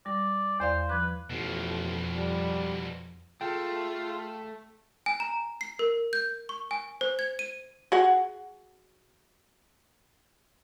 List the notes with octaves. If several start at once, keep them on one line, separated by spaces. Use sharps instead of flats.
G3 D5
E2 C5 D5 F5
F3 B4 D6
A1 F2 B2 F3
G3
A3 F4 G#4 G5
G#5
A#5
C7
A#4
G6
C#6
G#5
C5
G#6
D#7
F#4 G#4 F#5